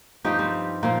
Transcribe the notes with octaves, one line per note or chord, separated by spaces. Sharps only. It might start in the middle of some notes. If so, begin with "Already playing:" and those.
G2 F3 D#4 G4
G3 C4
A#2 F3 A#3